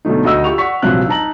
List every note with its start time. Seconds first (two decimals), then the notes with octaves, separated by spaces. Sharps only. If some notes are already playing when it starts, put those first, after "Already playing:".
0.05 B2 D3 F#3 A3 D#4
0.24 D2 F#4 D#5 E6
0.44 F4 G4 G5 C#6 F7
0.58 D5 F#5 C#6 B6
0.82 A#1 G2 C3 F3 F#3 F#6
1.08 D#4 A5 A#5 F#7